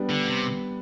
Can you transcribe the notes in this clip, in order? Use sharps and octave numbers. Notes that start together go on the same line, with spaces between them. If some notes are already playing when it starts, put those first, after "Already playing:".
Already playing: G3 B3 D4
D3
C3